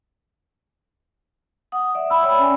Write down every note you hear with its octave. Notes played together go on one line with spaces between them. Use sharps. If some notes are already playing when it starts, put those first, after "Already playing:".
F#5 D#6
D5 E5
B5 E6
C#5 D5 G5
C#4 G#5